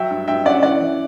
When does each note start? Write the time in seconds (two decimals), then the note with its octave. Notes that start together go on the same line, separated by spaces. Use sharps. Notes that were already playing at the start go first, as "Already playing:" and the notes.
Already playing: F#3 E5 G5
0.11 G2
0.28 G2 E5 G5
0.45 C#4 D5 F#5
0.63 E3 D5 F#5
0.80 E3